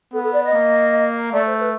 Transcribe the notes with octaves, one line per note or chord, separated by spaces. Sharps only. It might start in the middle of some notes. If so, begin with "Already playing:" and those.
B3 A4
A4
D5
D#5
A#3
A3 D5
C5
B4